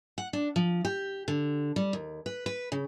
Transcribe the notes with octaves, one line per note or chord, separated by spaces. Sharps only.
F#5
D4
F3
G4
D3
G3
D#2
B4
B4
C#3